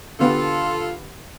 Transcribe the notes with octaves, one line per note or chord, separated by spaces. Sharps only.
D3 B3 F4 G4 A4